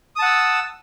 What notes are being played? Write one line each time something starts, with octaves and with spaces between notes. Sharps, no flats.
F#5 A5 D#6 E6